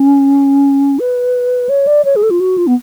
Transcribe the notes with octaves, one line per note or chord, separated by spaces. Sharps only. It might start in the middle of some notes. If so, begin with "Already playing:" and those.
Already playing: C#4
B4
C#5
D5
C#5
G#4
A4
F4
F#4
F4
B3